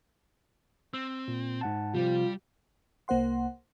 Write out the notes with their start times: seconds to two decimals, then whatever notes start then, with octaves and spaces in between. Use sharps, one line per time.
0.94 C4 E6
1.28 A#2
1.61 G#2 F#5 A5
1.94 C3 F3 G3 C4 F4
3.08 C2 A#3 C5 F#5 C6